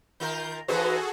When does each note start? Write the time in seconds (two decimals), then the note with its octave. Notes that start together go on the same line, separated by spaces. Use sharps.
0.20 D#3 F4 A#4 G6
0.68 E3 D#4 F#4 G#4 A4 B4 C5